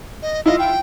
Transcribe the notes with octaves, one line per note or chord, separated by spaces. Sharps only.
D#5
E4 F4 D#5
G5